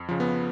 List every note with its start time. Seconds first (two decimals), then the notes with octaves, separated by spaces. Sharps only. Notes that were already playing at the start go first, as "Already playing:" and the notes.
Already playing: F2
0.09 C#3 F3
0.20 B3